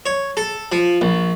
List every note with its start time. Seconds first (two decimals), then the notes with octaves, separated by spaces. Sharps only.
0.06 C#5
0.37 A4
0.72 F3
1.01 A#1